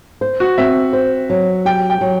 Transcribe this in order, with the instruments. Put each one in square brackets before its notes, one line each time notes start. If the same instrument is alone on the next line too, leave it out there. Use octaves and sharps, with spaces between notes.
[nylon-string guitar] C5
[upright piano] F#4
[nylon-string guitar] C4 [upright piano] E5
[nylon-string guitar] C5
F#3
[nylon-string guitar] G4 [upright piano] G5
[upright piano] G5
[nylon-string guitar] F#3